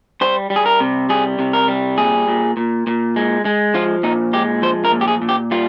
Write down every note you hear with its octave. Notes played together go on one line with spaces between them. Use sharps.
G3 C5
G3
G#4
A#4
C3
G3 G#4
C3
A#4
G3
A#2 G#4
A#2
A#2
A#2
G#3
G#3
F3 F4
A#2 D#4
G#3 G4
F3 C5
A#4
A#2
G4
G#4
A#2
G4
G3 F4